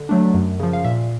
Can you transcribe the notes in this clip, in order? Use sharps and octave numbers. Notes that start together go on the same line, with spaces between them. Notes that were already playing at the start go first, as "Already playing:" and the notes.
Already playing: D3
F#3 A3 D4
F#2
C#3 F3
F5
A#2 E5